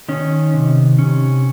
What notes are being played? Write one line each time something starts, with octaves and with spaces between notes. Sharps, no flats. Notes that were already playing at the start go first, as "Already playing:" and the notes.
D#3 C#4
C3
C3 C#4